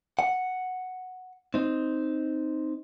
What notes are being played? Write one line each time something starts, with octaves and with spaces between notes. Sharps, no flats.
F#5
C4 D#4